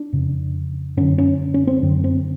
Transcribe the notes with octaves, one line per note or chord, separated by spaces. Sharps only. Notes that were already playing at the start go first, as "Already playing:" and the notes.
Already playing: D4
F2 C#3
F#2 D3 C#4
C#4
C#4
C4
F#2 D3
C4